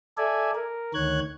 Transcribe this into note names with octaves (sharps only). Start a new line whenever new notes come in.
A4 D5 E5 G#5
A#4
D2 D#3 C#5 F#6 G#6